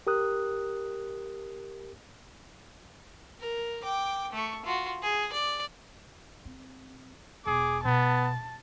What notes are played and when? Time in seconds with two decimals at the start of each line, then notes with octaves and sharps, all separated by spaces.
0.07 G4 A#4 D#6 F#6
3.40 A#4
3.83 G5 D6
4.33 A3 C#6
4.65 F4 F#4
5.02 G#4
5.33 D5
6.45 C4
7.46 E1 G#4 D6
7.85 B2 B3 A5